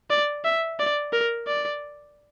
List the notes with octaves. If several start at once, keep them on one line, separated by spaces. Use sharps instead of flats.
D5
E5
D5
A#4
D5